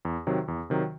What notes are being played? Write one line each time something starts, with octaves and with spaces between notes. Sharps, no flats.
E2
C3 D#3 F#3
E2
C3 D#3 F#3